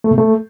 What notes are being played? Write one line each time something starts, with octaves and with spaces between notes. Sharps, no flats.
A3
B2
A3